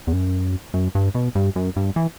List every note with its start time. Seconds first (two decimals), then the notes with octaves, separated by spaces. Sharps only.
0.07 E2
0.13 F#2
0.74 F#2
0.95 G2
1.15 B2
1.35 G2
1.56 F#2
1.76 G2
1.96 E3